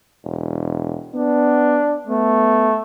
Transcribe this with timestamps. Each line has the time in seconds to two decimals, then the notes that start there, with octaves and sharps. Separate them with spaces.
0.24 E1
1.14 B3 D4
2.07 A3 B3